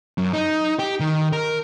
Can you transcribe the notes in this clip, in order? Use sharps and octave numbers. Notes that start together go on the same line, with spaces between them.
F#2
D#4
G4
D#3
A#4